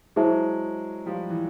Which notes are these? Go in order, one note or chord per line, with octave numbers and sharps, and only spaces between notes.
F#3 G#3 E4 G#4 C5 E5 A5
F3 G3
E3